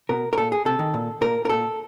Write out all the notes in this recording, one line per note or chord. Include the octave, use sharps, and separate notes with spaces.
B2 A#4
A#4
A#2 A4
G#4
C3 A4
D#3
A#2
A#2 A#4
A#4
A#2 A4